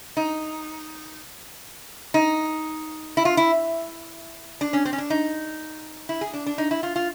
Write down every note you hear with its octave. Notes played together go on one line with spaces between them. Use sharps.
D#4
D#4
E4
F4
E4
D4
C#4
C4
C#4
D4
D#4
E4
G#4
D4
D4
D#4
E4
F4
F4